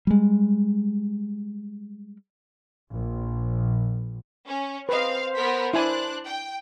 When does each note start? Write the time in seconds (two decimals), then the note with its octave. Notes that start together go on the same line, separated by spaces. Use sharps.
0.07 G3 G#3
2.92 A#1
4.47 C#4
4.89 C4 B4 C5 D#5 F5
5.35 B3 A#4 B6
5.74 D4 E4 G#5 F#6
6.26 G5